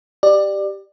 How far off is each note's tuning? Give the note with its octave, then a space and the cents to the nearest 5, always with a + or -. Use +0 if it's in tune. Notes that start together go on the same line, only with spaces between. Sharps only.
G4 +0 D5 +20